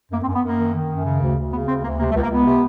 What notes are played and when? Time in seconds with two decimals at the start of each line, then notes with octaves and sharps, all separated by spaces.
0.12 F#2 A#3
0.24 C4
0.28 F#2
0.35 B3
0.43 F#2 A#3
0.58 D#3
0.74 D#3
0.90 F#2
1.05 C#3
1.21 D2
1.36 D2
1.52 C#3 B3
1.67 D2 C4
1.83 D2 A#3
1.99 C3 A#3
2.11 A3
2.15 C#2
2.23 A#3
2.30 C#2 B3
2.45 C3